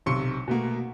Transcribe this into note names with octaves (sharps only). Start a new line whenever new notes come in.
B1 C3 C6 C#6 C#7
B2 A3 A#3